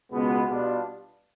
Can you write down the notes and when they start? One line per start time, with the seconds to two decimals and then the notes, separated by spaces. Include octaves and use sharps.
0.11 C#2 B2 G#3 B3
0.47 B2 G3 B3 D4 F4